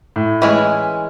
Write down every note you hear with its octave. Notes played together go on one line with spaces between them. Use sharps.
A2
E3 G#3 C#4